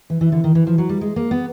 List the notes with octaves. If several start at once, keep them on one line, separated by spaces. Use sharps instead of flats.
E3
E3
D3
D#3
E3
F3
F#3
G3
G#3
A#3
B3